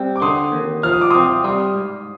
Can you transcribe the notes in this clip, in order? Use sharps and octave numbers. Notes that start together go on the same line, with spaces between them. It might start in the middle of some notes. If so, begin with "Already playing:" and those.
Already playing: G3 C4
D6
D3 C6 D#6
D#2
F3 F6
D#6
D6
C4 C6 D#6
G3 C6 D#6
G#2